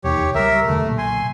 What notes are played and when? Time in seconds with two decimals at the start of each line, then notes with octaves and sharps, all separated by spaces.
0.04 E1 D#2 D#3 G4 C#5
0.35 C#2 G3 A#4 E5
0.66 E1 D3 A3
0.85 B1 A#2
0.98 G#5 C6